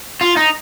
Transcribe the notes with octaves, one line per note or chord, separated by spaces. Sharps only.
F4
D#4